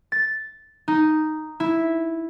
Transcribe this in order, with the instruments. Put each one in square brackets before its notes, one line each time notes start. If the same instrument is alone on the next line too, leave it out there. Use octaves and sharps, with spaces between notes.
[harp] A6
D#4
E4